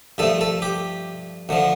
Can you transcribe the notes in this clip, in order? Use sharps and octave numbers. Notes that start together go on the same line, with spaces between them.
G2 F3 A3 A4
A4
G4
D2 D3 F3